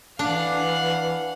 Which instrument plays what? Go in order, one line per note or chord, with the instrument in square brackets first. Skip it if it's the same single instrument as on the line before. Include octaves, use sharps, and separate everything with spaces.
[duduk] E3 [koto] D4 [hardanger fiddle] F5 F#5